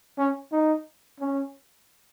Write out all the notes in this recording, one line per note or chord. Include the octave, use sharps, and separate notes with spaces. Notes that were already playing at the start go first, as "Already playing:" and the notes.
C#4
D#4
C#4